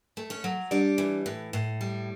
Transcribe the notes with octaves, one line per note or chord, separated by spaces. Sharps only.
A3
C#4 C#5
F#3
G3 D4 D5
E3
A2
A2
G3